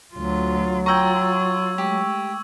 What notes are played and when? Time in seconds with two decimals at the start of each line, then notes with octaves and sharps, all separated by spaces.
0.14 D2 F#3 F4
0.86 F4 G5 A#5 C#6 E6 G#6
1.78 G#3 A3 G4